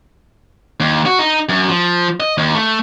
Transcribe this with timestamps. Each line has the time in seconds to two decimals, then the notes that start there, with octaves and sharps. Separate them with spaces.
0.80 D#2
1.06 F#4
1.19 D#4
1.49 F#2
1.69 F3
2.20 D#5
2.38 D#2
2.55 A3